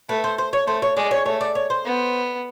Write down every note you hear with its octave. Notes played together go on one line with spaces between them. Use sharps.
A3 B4
C5
C5
C#5
A3 C5
C#5
G#3 D5
C#5
A3 C#5
D5
C#5
C5
B3